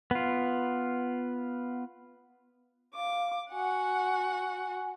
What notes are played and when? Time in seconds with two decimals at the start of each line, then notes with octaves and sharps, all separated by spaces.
0.11 B3 F4
2.95 F5 D6
3.51 F#4 F#5 G#5